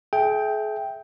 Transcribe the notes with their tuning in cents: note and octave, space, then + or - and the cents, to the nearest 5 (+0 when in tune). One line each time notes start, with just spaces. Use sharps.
G#4 +40 E5 +0 G5 +0